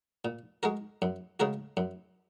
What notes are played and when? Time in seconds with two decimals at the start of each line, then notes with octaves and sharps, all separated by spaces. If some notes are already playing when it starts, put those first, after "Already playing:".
0.25 A#2
0.63 G#3 F#4 A#4
1.02 F#2
1.40 C#3 G#3 F#4 A#4
1.77 F#2